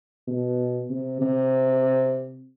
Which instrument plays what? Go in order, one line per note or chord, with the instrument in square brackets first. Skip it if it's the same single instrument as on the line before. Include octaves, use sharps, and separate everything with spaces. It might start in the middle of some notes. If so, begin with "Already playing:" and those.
[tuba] B2
C3
C3